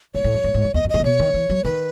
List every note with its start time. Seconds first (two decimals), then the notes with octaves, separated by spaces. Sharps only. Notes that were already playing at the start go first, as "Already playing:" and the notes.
0.14 G#2 C#5
0.24 A2
0.34 F#2
0.44 G#2
0.54 G#2
0.64 F#2
0.74 E2 D#5
0.84 F#2
0.89 G#2 D#5
1.00 A2
1.04 B2 C#5
1.19 D#3
1.34 E3
1.50 F#3
1.64 D#3 B4